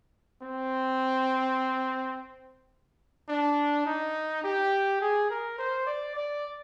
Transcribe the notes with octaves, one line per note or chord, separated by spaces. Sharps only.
C4
D4
D#4
G4
G#4
A#4
C5
D5
D5